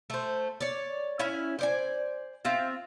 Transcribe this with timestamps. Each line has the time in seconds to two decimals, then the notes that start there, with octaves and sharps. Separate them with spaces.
0.10 A3 C5
0.61 C#5 D5
1.19 C#4 E4 G#5
1.59 C5 D5 G#5
2.45 C4 F4 E5